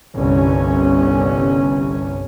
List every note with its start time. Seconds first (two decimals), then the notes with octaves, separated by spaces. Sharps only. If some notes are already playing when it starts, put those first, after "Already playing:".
0.16 G1 C2 C#4